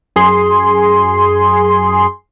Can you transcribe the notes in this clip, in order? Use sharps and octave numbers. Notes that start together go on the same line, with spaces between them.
F#2 G#4 C6